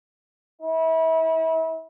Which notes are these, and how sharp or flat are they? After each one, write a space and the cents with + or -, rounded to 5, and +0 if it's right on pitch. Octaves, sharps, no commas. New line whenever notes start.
E4 -35